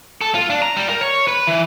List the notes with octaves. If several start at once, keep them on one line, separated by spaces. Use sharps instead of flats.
A4
F4
D4
A#5
G3
A#4
C#5
B4
E3